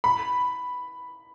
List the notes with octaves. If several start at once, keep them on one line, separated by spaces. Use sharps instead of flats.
B5